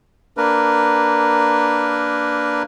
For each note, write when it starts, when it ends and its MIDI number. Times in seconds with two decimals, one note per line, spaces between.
0.37 2.63 58
0.37 2.63 62
0.37 2.63 70
0.37 2.63 71